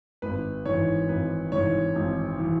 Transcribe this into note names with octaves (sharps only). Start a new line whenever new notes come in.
G#1 B4
G#2 E3 C#5
G#1 B4
G#2 E3 C#5
G#1
E3